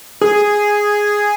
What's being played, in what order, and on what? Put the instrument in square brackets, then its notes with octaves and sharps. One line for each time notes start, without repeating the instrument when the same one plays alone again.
[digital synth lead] G#4